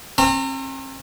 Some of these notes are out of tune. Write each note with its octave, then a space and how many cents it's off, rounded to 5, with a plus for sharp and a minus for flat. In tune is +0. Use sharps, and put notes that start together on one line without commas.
C4 +45 A#5 -35